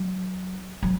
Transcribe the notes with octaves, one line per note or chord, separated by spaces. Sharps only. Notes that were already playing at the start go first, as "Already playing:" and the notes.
Already playing: F#3
F#3